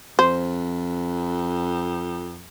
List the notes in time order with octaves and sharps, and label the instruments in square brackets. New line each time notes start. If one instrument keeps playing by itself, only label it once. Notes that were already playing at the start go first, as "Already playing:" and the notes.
[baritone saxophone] F2 [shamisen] C5